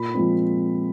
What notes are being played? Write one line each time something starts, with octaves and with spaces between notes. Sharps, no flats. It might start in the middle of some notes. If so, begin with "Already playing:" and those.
Already playing: A#2 B5
F3 G#3 C4